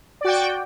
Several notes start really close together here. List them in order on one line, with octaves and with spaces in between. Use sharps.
D5 F#4 G5